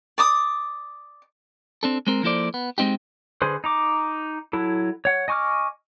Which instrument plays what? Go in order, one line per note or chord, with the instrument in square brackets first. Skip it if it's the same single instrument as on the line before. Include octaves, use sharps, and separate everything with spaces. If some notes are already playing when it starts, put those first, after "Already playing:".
[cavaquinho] D5 D6 D#6
[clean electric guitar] C4 D4 A4
G#3 C4 A#4
F3 A#3 E4 A4 C5 D5
B3
G#3 A3 C4 D#4 G4
[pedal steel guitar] D3 G#4 B4 C5
D#4 A#5 D6
F#3 E4 A4
C#5 F#5
D#5 G#5 C#6 D6 F6